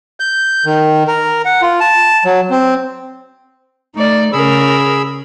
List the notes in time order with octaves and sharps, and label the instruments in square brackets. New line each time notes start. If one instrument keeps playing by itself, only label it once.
[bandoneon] G6
D#3
A#4
F#5
F4
A5
F#3
C4
[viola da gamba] A3 D5 [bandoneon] D#4
[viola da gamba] C#3 A#4 [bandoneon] G#4 B5 E6